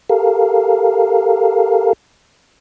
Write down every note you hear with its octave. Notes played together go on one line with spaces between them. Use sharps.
G4 A4 A#4 F5